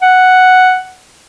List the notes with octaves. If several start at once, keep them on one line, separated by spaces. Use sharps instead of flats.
F#5